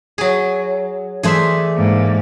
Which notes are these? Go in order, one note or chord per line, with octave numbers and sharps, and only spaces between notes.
F#3 G#4
E3 A3 G#4 C5 D5 E5
G#2 A#3